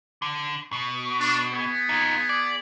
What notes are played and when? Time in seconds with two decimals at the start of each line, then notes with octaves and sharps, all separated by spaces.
0.22 D3
0.73 B2
1.21 D4
1.53 B3 G#4
1.89 D#4 F4
2.29 D5